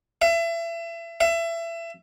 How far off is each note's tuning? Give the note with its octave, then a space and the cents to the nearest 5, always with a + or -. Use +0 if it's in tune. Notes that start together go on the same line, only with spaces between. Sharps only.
E5 +30
E5 +25